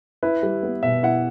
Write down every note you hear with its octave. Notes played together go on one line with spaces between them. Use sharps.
E4 B4
G3
B3
B2 E5
E4 F#5